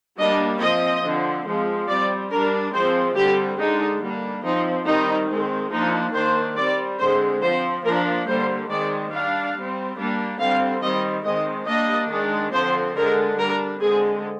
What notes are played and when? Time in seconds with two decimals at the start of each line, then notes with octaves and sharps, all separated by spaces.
0.17 G3 A#3 D4 D#5
0.61 F3 C4 D#5
1.03 D3 F3 C4
1.45 F3 G#3 C4
1.88 G3 C4 D5
2.31 G3 D4 A#4
2.73 F3 G#3 C4 C5
3.16 D3 G3 C4 G4
3.59 D3 G#3 D4 D#4
4.00 G3 A#3 D4
4.44 F3 C4 D#4
4.86 D#3 G3 C4 D#4
5.29 D#3 G#3 C4
5.71 F3 A#3 D4 D#4
6.13 D#3 A#3 D4 C5
6.57 G3 C4 D5
6.99 D3 G#3 C4 C5
7.42 F3 C4 C5
7.84 F3 A#3 D4 A#4
8.27 D3 G3 A#3 C5
8.69 D#3 G#3 C4 D5
9.11 G3 D4 F5
9.55 G3 C4
9.97 G3 A#3 D4
10.39 D3 G3 C4 F5
10.82 D#3 G3 C4 D#5
11.25 D#3 G#3 C4 D#5
11.67 G3 A#3 D4 D#5
12.10 D#3 G#3 D4
12.52 D3 F3 C4 C5
12.95 D3 G#3 D4 A#4
13.38 G3 D4 A#4
13.80 D3 G#3 C4 G#4